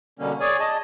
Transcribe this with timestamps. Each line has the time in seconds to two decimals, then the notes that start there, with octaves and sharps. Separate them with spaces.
0.19 B2 D3 G3 A#3 C#4
0.40 G#4 C#5 D5 G#5
0.60 D#5 A5